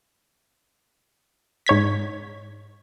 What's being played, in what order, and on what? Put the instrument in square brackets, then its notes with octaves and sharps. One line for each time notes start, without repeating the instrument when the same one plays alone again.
[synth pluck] G#2 C#5 G#6 B6